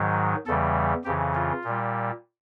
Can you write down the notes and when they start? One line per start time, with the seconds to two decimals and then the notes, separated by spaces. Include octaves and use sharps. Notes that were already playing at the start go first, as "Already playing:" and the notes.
Already playing: G#2 D#3 F#3
0.46 E2 C#3 E3 G3 A4
1.05 F2 C#3 E3 G4
1.35 F4
1.64 A#2 G3